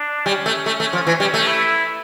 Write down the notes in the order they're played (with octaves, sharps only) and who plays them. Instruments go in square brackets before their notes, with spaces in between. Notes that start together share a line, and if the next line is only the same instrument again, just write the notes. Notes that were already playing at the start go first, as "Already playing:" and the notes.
Already playing: [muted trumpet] D4
[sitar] G3 [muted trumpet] C#4
[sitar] A3
A3
A3
F3
E3
G3
A3
[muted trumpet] E4